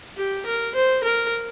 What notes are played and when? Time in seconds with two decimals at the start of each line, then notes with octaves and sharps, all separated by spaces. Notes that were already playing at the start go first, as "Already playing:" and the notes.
0.17 G4
0.46 A#4
0.75 C5
1.04 A#4